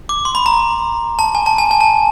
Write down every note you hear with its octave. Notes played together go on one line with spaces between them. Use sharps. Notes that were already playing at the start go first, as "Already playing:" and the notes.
D6
C6
B5
A#5
A5
G#5
A5
G#5
G#5
A5